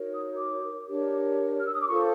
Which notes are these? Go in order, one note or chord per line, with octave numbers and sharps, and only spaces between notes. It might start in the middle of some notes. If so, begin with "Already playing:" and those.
Already playing: D#4 F#4 A#4 C#5
D#6
D6
D4 G4 A#4 C#5
F6
E6
D#6
D6
F4 A4 C5 C#6